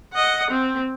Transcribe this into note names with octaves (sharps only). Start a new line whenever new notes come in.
D#5 F#5
C4